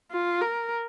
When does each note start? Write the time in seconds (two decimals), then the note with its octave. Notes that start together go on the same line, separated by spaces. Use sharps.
0.11 F4
0.42 A#4